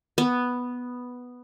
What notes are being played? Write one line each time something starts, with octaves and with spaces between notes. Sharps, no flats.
B3